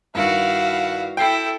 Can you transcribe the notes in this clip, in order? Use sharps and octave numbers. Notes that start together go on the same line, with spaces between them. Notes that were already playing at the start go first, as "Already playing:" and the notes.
G2 D#3 E4 F#4 F5
E4 A4 G5 C7